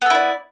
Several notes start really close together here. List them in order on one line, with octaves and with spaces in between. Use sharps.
B3 A4 E4 D5